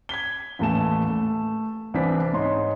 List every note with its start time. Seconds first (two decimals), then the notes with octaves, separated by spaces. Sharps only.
0.09 G#6 B6 G7
0.59 A1 D#2 E3 A3 A5 E7
1.10 A3
1.94 C2 E3 C4 D4 B6
2.33 G#2 D#4 C#5 C6